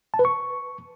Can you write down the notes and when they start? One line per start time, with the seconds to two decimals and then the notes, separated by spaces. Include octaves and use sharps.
0.14 A5
0.19 B4
0.25 C#6